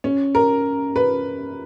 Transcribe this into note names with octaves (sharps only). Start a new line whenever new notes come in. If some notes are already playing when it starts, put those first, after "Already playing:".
C#4
A#4
B4